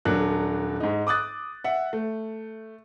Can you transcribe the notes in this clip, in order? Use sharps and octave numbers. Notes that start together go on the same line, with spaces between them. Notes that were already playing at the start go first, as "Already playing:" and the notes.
D#1 F#3 A#3 D4 A4 F#6
G#2 D#4
D6 D#6 F#6 A6
E5 F#5
A3